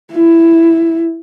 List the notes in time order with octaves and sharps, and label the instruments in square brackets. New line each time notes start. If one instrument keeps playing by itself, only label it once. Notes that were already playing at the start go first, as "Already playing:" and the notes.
[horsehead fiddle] E4